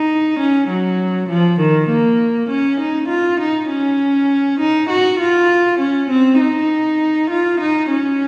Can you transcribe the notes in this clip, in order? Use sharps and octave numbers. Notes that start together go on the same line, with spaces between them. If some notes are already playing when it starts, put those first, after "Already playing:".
Already playing: D#4
C#4
F#3
F3
D#3
A#3
C#4
D#4
F4
D#4
C#4
D#4
F#4
F4
C#4
C4
D#4
F4
D#4
C#4